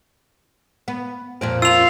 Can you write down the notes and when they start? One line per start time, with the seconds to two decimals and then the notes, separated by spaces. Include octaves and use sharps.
0.88 B3
1.41 F2 A#2 C4
1.62 F4 E6 F7